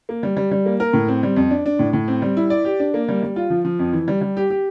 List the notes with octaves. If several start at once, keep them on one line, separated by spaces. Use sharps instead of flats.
A#3
G3
G3
G3
A#3
A#4
A2
C4
G3
F2
D4
D4
A2
A2
C4
G3
E4
D5
G4
D4
A#3
G3
G3
F4
F3
F3
F2
E3
G3
G3
G4
G4